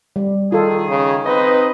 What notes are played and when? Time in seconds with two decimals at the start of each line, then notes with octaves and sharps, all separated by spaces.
0.16 G3
0.52 D#3 F4 G#4 A4
0.89 C#3
1.26 C4 D#4 B4 D#5